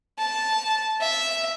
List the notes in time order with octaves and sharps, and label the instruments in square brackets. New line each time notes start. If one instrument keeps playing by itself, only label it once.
[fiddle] A5
E5